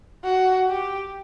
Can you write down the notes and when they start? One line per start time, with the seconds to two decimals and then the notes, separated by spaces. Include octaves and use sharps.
0.24 F#4
0.68 G4